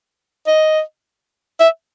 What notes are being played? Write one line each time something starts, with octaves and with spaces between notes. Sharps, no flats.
D#5
E5